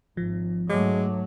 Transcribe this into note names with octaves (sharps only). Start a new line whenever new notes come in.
G#1 F3
G#2 F#3 G#3 A3 D6